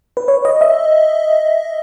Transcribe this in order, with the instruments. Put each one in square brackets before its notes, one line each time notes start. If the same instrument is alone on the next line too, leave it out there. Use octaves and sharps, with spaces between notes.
[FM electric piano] B4
C#5
D#5
E5